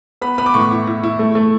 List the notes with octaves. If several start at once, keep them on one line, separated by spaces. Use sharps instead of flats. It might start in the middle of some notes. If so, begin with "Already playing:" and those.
B3 B5
B3 B5
D6
A2 C#6
E4
E4
E4
A3
A3